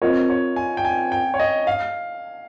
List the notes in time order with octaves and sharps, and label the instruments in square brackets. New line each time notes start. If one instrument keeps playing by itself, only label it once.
[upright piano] C4 F4 A#4 D#5 [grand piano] C#5
[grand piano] C#5
G#5
G5
G#5
G5
C#5
D#5
F5